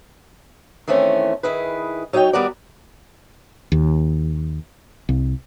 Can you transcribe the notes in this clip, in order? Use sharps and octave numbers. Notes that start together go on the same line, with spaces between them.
D#3 E3 A3 C4 C#4
D#3 E4 G#4 B4
F#3 D#4 C#5 F#5 G5
D#3 G3 B3 F#4 A#4 D5
D#2
C2